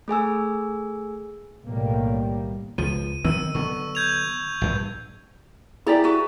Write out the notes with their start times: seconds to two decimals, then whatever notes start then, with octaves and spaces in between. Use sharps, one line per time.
0.08 A3 G#4 G#5 E6
1.66 B1 A2 D#3 G3 A#3
2.78 C#2 F3 D#7
3.25 D#3 F#3 C4 E6 D#7
3.55 D3 F#3 B3 C#6
3.95 G6 G#6 F7
4.61 A#1 G2
5.87 E4 G4 G#4 D5 A#5
6.04 F#4 B4